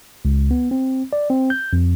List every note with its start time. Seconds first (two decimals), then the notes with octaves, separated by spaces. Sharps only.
0.25 C#2
0.51 B3
0.71 C4
1.13 D5
1.30 C4
1.50 G6
1.73 F2